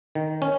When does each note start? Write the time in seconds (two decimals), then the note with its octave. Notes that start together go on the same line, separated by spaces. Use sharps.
0.15 D#3
0.42 C#4